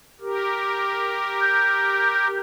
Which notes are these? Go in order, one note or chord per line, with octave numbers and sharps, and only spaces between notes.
G4 A#4
G6